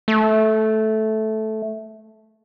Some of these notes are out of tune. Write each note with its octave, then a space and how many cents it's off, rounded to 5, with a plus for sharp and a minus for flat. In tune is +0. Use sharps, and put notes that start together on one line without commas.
A3 -10